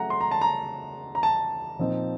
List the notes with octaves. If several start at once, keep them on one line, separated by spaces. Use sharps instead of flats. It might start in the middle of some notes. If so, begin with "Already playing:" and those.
Already playing: C#3 F#3 A3 F#5 A#5
C6
A#5
A5
A#5
A#5
A5
A#2 F3 C4 D#4